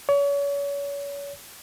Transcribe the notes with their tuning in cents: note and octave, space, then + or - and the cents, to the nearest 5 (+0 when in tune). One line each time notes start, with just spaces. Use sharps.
C#5 +35